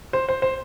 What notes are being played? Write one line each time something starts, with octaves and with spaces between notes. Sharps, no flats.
C5
C5
C5